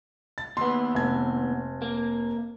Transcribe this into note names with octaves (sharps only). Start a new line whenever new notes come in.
A6
D#2 B3 C6
F1 G#6
A#3